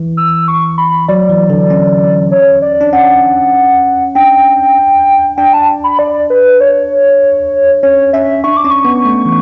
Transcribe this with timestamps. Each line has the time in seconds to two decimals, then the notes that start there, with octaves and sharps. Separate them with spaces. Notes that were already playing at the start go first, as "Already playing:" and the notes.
Already playing: E3
0.17 E6
0.48 C#6
0.78 B5
1.08 F#3 D5
1.29 E3
1.50 D3
1.70 C#4
2.31 C#5
2.62 D5
2.81 D4
2.93 C#4 F#5
4.15 D4 G5
5.37 D4 G5
5.53 A5
5.84 B5
5.99 D5
6.30 B4
6.60 C#5
7.83 C#4 C#5
8.13 C#4 E5
8.44 D4 C#6
8.57 D6
8.64 C#4
8.71 C#6
8.85 B3
9.05 A3
9.26 E3